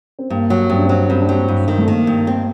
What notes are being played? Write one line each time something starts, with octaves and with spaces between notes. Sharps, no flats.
C4
G2 A#3
F#3
G2 C4
D4
F#3 C4
G2 C4
D4
F#3 C4
G2
D#3
A3
D#3 A#3
G2
C4